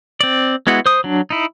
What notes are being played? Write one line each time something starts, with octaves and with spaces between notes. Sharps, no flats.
C4 D5
G#3 B3 E4 F#4
C5 D#6
F#3 D4
D#4 E4